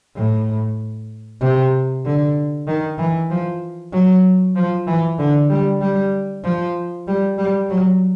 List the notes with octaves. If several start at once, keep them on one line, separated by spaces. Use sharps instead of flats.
A2
C3
D3
D#3
E3
F3
F#3
F3
E3
D3
G3
G3
F3
G3
G3
F#3